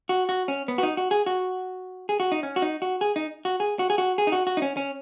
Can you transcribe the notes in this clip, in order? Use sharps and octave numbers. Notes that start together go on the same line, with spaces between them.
F#4
F#4
C#4
B3
F#4
D#4
F#4
G#4
F#4
G#4
F#4
D#4
C#4
F#4
D#4
F#4
G#4
D#4
F#4
G#4
F#4
G#4
F#4
G#4
D#4
F#4
F#4
D#4
C#4
C#4